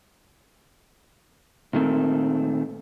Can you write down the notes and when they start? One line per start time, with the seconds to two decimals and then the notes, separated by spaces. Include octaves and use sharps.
1.73 A#2 D#3 A3 C4